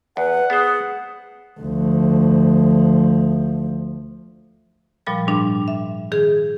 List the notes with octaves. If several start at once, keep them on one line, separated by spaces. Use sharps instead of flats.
E2 B4 F#5
B3 G#4 C5
D2 F3
A#2 F3 G3 B5 A6
G#2 G3 D4
E5
D#3 G#4 G#6